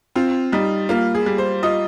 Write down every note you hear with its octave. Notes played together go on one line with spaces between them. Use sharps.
C4 F4
G3 D#4
A#3 F4
G#4
G3
C5
F4 D#5